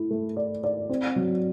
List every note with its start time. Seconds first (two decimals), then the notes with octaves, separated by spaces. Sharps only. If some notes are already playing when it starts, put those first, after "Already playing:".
Already playing: A3 E4
0.10 A3
0.37 D5
0.64 D5
0.90 C4
1.16 F#3